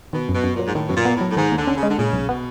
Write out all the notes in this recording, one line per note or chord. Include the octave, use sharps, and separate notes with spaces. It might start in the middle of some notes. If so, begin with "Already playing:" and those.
B2 D#3
F#2
B2
F#2
A#2 F#3
G#2
A2 D#3
F#2 B2
A#2
B3
A2
F#3
A2
G#2 D#3
D#2 D3
C#4
C#3
G#3
D3
A#2 C#3
B1
B2 B3